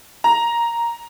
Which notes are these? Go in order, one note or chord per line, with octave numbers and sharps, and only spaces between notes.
A#5